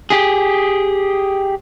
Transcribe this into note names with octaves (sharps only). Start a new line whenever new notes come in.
G4 G#4